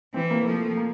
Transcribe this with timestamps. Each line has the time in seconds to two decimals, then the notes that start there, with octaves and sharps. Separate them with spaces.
0.14 E3 C4
0.30 A#3
0.45 F3 A3
0.77 A#3